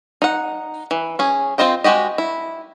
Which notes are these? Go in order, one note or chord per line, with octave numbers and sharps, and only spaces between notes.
D#4 F#5
E3
C#4 G#4
C4 F4 C5 D#5 G5
G#3 F#4 G4 D#5
E4